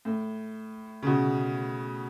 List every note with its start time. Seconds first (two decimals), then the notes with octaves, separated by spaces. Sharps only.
0.05 A2
1.02 C#3
1.07 B2